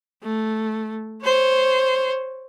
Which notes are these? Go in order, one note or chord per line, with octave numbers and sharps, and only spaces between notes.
A3
C5 C#5